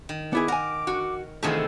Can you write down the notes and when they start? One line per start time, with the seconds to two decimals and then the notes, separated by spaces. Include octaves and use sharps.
0.09 D#3
0.33 B3 E4 G#4 D6
0.48 A#4 F#5 G#5
0.87 F#4
1.43 E2 C3 D#3 A3 F4 G#4 A4